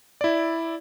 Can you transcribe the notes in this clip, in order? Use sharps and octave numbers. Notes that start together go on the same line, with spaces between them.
E4 D5